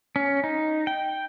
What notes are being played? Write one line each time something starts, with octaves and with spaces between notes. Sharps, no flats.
C#4
D#4
G5